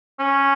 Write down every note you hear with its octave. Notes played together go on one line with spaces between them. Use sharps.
C#4